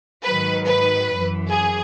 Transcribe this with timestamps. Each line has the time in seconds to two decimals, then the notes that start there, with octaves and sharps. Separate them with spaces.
0.25 G#2 D#3 F#3 B4
0.66 B4
1.09 F#2
1.14 E3
1.52 G#4